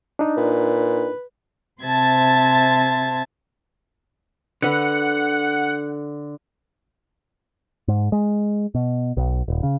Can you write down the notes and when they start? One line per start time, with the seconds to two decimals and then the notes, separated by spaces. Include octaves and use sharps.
0.19 D4 D#4
0.37 A#2 B4
1.82 C3 C5 E5 A5 G#6 A6
4.62 D3 B4 F#5
7.88 G#2
8.12 G#3
8.75 B2
9.17 B1
9.48 D#1
9.63 C#3